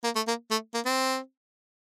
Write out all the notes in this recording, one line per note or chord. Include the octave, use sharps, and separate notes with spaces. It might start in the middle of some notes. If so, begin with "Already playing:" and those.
A#3
A3
A#3
A3
A#3
C4